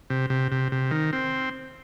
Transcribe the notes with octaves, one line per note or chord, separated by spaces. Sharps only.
C3
C3
C3
C3
D#3
C4